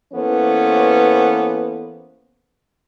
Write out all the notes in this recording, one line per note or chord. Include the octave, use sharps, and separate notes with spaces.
E3 A#3 B3 C#4 A4 C5